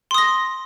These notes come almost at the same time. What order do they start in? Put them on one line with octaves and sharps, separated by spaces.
C6 D#6 A#6